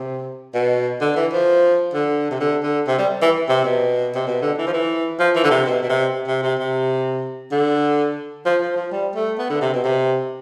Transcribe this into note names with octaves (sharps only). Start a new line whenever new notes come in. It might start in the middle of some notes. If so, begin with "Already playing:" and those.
Already playing: C3
B2
D3
E3
F3
D3
C3
D3
D3
C3
G3
E3
C3
B2
C3
B2
D3
E3
F3
E3
F3
E3
D3
C3
B2
B2
C3
C3
C3
C3
D3
F3
F3
F3
G3
A3
B3
D3
C3
B2
C3